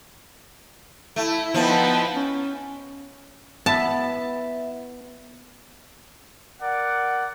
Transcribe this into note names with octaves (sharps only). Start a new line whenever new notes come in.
A3 E4
F3 B3 D#4 E4 G5 A5 B5
C#4
B3 E4 E5 A5
A#4 D5 F#5